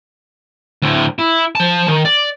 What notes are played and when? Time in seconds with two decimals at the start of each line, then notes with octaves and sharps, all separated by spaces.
0.82 D2 A2
1.19 E4
1.55 F3 A5
1.88 D#3
2.05 D5